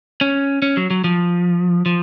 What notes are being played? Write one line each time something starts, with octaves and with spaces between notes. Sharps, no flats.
C#4
C#4
F#3
F#3
F3
F3